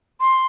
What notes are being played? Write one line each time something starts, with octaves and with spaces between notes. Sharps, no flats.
C6